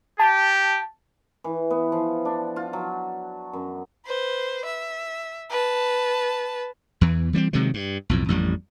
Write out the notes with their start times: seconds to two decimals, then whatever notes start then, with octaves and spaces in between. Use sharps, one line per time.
0.20 G4 A5
1.44 E3
1.70 B3
1.92 F3
2.25 D4
2.56 F4
2.73 F#3
3.53 F#2
4.06 B4 C5
4.65 E5
5.50 B4 A5
7.01 E2 E3
7.33 E3 G3 B3 C4
7.53 C3 D#3 F#3 G#3
7.74 G2
8.09 B1 F2 A2
8.29 A1 F2 G3